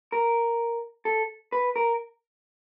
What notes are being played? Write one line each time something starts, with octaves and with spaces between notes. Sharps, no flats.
A#4
A4
B4
A#4